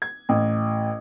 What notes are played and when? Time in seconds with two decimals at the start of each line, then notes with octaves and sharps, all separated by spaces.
0.02 G#6
0.29 A1